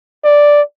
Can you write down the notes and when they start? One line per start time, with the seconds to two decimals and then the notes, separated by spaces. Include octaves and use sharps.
0.24 D5